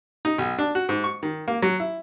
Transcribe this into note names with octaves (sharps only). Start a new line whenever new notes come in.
D#4
B1
D4
F#4
G#2
C#6
D#3
A#3
F#3
E4